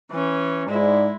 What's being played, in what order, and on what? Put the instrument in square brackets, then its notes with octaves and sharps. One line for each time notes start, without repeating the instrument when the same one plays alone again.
[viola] E3 C#4
[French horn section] G#2 D5 [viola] G#3 E4